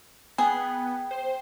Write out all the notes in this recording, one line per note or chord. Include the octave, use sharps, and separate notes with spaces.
B3 G#4 G5
C5